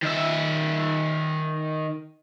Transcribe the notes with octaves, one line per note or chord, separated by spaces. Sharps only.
D#3 E5